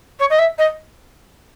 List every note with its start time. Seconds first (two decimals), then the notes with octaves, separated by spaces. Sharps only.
0.19 C#5
0.29 D#5
0.38 E5
0.58 D#5